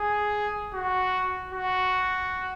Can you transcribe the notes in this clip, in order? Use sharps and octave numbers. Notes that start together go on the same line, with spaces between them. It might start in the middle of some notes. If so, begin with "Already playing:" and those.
Already playing: G#4
F#4
F#4